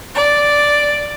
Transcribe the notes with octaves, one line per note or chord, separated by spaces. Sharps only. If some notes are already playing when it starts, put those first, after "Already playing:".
D5